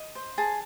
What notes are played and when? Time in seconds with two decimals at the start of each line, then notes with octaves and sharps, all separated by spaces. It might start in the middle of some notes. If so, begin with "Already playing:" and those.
Already playing: D#5
0.15 C5
0.38 G#4 A5